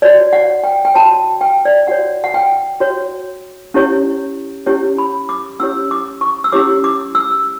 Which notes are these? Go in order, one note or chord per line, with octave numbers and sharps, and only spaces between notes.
F#4 C#5 D5
F#5
G5
G5
F#4 C#5 A5
G5
D5
F#4 C#5 F#5
F#5
G5
F#4 C#5
C#4 E4 G4 C#5
C#4 E4 G4 C#5
B5
D6
C#4 E4 G4 C#5 E6
D6
C#6
E6
C#4 E4 G4 C#5 D6
D6
E6